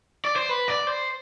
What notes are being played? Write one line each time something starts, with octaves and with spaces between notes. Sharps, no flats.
D5
C5
B4
D5
C5